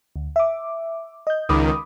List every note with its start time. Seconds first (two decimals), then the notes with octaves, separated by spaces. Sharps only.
0.16 D2
0.36 E5 D6
1.27 D#5 G6
1.49 C#2 D#3 B5 D6 D#6